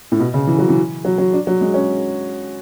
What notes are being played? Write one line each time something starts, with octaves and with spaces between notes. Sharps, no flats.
A2
B2
C#3
E3
F#3
E3
F#3
F#3
D4
F#3
G#3
C#4